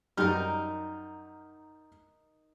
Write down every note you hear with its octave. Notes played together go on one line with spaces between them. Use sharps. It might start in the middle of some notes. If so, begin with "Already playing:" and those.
F#2 G3 D#4 A#4 F6